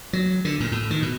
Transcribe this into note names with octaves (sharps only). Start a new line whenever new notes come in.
F#3
D3
A#2
A2
D#3
B2